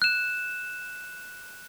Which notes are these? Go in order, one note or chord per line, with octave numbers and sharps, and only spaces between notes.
F#6 E7